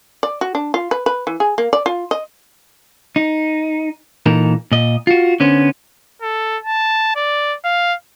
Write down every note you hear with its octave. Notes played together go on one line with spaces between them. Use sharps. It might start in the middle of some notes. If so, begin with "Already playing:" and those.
D5
F#4
D4
F4
B4
B4
E3
G#4
A#3
D5
F4
D#5
D#4
A#2 E3 D#4 A4 A#4
A#2 D#5
F4 F#4
D3 B3 C#4 C5
A4
A5
D5
F5